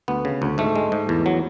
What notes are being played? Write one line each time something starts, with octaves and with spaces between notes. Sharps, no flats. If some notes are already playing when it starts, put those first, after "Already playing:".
D2 B3
C#3
D2
G#2 A3
G#3
G#2
E2
F#3